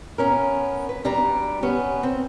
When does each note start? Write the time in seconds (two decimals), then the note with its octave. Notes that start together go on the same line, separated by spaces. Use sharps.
0.18 B3 C#4 A#4
0.89 B4
1.04 B2 G3 D4 G4 A#5
1.63 B3 C#4
2.03 C4